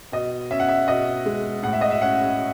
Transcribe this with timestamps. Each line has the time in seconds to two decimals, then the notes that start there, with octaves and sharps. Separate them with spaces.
0.12 B2 D#5
0.51 C#4 E5
0.60 F#5
0.68 E5
0.88 B2 D#5
1.26 G#3
1.63 A2 F#5
1.73 E5
1.81 D#5
1.90 E5
2.02 C#4 F#5